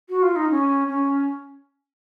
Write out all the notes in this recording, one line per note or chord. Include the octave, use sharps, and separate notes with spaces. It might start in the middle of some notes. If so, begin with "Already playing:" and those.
F#4
F4
D#4
C#4
C#4